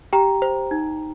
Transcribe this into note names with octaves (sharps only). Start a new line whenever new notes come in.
G4 G5 A#5
C5
D#4